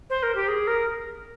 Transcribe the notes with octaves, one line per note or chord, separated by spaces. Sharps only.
C5
A#4
G4
G#4
A#4